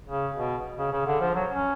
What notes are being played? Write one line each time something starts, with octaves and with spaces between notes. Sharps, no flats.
C#3
B2
C#3
C#3
D3
F3
F#3
C#4